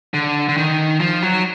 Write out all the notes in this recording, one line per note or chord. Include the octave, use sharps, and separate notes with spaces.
D3
D3
D#3
F3
F#3